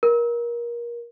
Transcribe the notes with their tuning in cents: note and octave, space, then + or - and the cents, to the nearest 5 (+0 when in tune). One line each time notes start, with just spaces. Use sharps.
A#4 +25